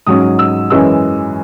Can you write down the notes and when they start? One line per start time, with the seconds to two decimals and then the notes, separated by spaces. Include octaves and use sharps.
0.07 G#2 F#3 C#4 D#6
0.39 E6
0.70 F#2 E3 G#3 C#4 E6